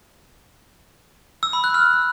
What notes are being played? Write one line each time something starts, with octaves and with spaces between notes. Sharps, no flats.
E6
B5
F#6
F6